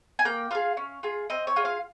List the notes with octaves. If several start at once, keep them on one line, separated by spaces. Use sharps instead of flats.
G#5
A#3 G5
F4 G#4 F5
C#4
F4 G#4
C4 D#5
C#5
F4 G#4
F5